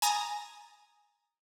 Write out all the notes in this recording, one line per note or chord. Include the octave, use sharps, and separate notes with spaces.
G#5 A#5 D#6 A6